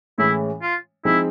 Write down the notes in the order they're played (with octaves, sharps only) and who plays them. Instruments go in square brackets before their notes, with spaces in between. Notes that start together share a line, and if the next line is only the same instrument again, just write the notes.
[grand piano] A2 E3 G#3 C#4 [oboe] E4
[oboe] F4
[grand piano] F3 G#3 C4 D#4 G#4 [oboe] E4